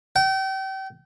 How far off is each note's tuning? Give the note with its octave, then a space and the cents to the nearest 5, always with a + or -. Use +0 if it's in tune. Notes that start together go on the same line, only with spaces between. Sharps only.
G5 -35